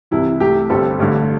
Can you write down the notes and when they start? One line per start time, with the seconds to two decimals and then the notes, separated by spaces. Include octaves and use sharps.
0.11 C2 C3 E3 E4
0.40 C2 C3 A3 G4
0.69 G1 G2 G3 C4 A4
0.99 A1 G2 D3